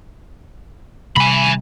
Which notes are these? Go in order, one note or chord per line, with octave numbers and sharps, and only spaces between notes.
C3 G3 G#5 B5